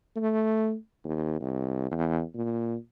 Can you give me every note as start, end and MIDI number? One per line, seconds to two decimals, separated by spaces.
0.16 0.75 57
1.05 1.40 39
1.41 1.90 36
1.91 2.22 40
2.34 2.76 46